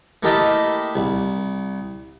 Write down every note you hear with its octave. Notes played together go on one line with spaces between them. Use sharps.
A3 A#3 E4 G4 D#5 A5
C2